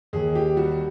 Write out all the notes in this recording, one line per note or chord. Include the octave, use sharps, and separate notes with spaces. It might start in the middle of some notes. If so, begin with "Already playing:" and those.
D#2 G#4
G4
G3 F#4